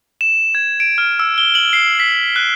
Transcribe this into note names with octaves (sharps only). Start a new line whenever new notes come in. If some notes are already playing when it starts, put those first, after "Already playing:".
E7
G#6
D7
F6
E6
G7
F#7
C7
B6
F#6